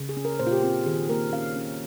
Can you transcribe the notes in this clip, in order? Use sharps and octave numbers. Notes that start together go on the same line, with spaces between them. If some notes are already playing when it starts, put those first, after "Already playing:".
Already playing: C#3
G#4
C#4
A#4
A#2 C5
F4
G4
C4 F4
D#3 G#4
A#3 A#4
C#4 F5
C#4